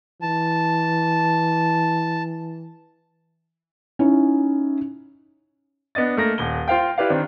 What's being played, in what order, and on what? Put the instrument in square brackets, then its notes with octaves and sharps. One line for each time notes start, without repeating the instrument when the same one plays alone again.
[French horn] E3 [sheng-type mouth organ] A5
[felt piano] C#4 D#4 E4
[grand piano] B3 D4 D#5 A6
A3 A#3 A#6
D#1 G7
F4 C5 F5 G5
E4 G4 B4 D5 F5
D#3 C4 D4